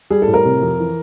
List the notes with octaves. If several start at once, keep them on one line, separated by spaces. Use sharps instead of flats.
G3 G#4
A4
A2
A#4
C3
F2
E3